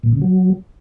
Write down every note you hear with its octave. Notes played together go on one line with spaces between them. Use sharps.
A#2
C#3
F#3